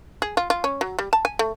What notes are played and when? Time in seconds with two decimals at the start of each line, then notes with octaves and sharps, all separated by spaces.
0.22 G#4
0.37 F4
0.50 F4
0.64 C#4
0.81 F#3
0.99 G3
1.13 A5
1.25 G#5
1.39 A3